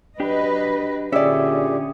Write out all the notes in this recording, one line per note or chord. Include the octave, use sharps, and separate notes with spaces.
F#3 D4 G4 B4 D#5
A#2 D3 C#4 G4 G#4 D5 E5